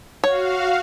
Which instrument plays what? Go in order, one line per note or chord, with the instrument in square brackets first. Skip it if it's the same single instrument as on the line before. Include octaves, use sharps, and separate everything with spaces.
[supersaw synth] F#4 F5 [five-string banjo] C#5